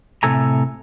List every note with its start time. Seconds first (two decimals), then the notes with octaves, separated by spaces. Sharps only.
0.23 A2 C3 A4 G#5 A#5